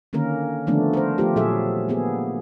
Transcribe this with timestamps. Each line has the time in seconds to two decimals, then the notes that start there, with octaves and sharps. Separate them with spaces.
0.13 D3 D#3 A#3 C#4 A#4
0.67 D3 D#3 F3 A3 B3 D4
0.94 A#4 C5
1.18 F3 A3 F4 G4
1.36 A#2 F#3 G#4 A4 E5
1.89 A#3 B3 G#4